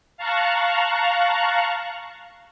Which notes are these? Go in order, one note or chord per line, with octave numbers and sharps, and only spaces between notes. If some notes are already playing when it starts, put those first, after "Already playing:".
F5 A5 A#5 C#6 F#6